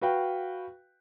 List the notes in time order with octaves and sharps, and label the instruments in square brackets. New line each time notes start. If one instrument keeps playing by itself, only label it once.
[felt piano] F#4 B4 F5 G5